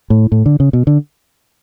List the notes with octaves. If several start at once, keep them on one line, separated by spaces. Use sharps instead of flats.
A2
A2
D3
C#3
B2
D3